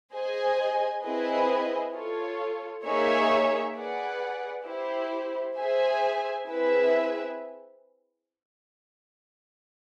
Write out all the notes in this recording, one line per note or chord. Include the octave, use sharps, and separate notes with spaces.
G#4 C5 D#5 G#5
C4 E4 G#4 B4 D#5
F4 A4 C#5
A#3 D#4 G#4 C#5 E5
G#4 B4 D5 F#5
E4 G4 C5
G#4 C5 E5 G#5
C4 E4 G#4 B4 E5